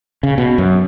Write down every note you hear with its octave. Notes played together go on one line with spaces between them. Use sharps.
C#3
B2
F#2